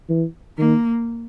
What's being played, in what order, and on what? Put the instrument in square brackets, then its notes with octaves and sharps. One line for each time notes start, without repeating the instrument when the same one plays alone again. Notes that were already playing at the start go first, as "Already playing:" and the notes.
[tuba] E3
[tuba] D#3 [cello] A#3